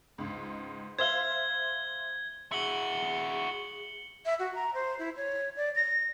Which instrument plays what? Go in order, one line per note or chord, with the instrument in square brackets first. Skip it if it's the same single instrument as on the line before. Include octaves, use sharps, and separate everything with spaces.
[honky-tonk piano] C#2 G#2
[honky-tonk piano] C5 E5 F5 [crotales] G#6 G7
[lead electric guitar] E4 F#4 [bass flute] G#4 [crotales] C#7 F#7 G7
[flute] E5
F#4
A#5
C5
E4
C#5
D5
A#6